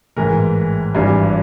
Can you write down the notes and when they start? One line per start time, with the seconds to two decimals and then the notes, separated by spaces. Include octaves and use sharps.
0.16 A1 G#2 E3 G#3 A#4
0.95 G#1 G2 E3 G3